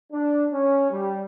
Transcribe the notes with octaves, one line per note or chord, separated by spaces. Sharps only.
D4
C#4
G3